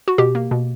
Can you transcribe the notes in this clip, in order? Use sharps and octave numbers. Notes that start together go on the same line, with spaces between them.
F#4
B2 G4
A#3
B2